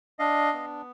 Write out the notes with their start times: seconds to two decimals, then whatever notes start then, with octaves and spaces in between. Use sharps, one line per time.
0.19 D4 D#5 F5
0.53 B3